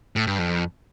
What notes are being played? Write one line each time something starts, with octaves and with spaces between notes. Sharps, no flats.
A2
G2
F2